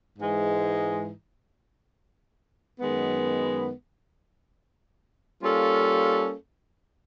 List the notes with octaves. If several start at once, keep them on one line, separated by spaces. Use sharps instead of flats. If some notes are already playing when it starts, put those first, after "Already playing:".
G#2 E3 G#3
F#2 D#3 G#3 B3
G3 A#3 C#4 F4 A4